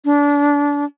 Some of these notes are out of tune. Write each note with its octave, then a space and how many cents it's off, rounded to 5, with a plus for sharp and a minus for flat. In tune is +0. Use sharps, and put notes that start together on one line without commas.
D4 -25